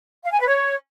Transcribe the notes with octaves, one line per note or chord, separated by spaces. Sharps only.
F5
G#5
B4
C#5